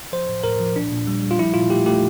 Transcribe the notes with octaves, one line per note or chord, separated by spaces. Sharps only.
F3 C5
A2
A2 A#4
F3
A#2 D4
A#2
G3
G3
F4
F3 E4
A#2 F4
A3 G4
A3 G4